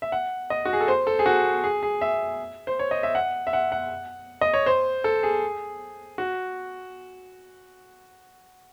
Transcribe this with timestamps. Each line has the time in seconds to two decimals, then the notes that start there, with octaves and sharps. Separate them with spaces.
0.02 E5
0.12 F#5
0.50 D#5
0.65 F#4
0.73 G#4
0.81 A4
0.88 C5
1.07 A4
1.19 G#4
1.26 F#4
1.64 G#4
1.83 G#4
2.01 E5
2.67 C5
2.79 C#5
2.91 D#5
3.03 E5
3.15 F#5
3.47 E5
3.53 F#5
3.72 F#5
4.41 D#5
4.54 C#5
4.66 C5
5.04 A4
5.23 G#4
6.18 F#4